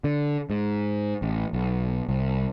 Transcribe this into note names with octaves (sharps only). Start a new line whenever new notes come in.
D3
G#2
A1
B1
C2